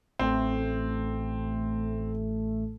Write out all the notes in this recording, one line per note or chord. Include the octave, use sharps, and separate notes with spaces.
A1 A3 C4